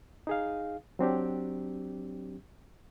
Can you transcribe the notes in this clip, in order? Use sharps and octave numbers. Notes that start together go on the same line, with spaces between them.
D#4 G#4 F5
F#3 C4 D4 G4